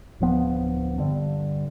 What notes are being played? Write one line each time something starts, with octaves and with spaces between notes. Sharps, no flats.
D1 F3 B3
G2 D3